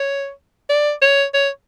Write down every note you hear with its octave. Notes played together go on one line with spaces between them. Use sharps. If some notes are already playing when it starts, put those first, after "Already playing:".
Already playing: C#5
D5
C#5
C#5